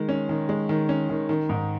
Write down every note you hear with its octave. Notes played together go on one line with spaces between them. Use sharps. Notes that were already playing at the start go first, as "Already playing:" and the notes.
Already playing: D#3 G#3
C#4
D#3
G#3
D#3
C#4
D#3
D#3
G#2